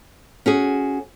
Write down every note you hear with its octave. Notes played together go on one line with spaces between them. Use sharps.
C#4 F#4 G#4